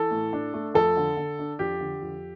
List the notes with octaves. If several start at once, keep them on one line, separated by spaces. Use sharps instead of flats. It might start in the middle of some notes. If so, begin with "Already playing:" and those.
Already playing: E3 A4
A2
D4
A3
F2 A4
D3
D3
D4
F2 G4
D3
F2